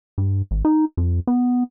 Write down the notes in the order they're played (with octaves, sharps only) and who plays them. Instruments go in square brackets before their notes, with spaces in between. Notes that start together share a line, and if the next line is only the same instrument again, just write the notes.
[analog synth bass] G2
G#1
D#4
F2
B3